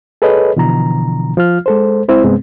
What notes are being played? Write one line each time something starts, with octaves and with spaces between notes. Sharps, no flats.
G#4 A4 B4 C#5 D#5
B2 D3 E3 F3 A#5
F3 F4 F6
G#3 A4 C5
G#3 C4 E4 C5
G2 C3 G#3 B3 C4